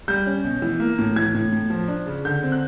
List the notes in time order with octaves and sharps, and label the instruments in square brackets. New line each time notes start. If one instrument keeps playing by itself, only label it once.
[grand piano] G3 G6
C#4
B2
E3
A#3
A2
E3 G#6
A2
A2
F3
D4
C#3
D3 G6
C4
F#6